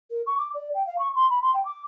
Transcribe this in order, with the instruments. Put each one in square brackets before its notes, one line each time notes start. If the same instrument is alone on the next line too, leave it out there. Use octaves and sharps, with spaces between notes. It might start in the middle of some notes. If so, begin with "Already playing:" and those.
[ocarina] A#4
C#6
D6
D5
G5
F5
C#6
C6
B5
C6
G5
D6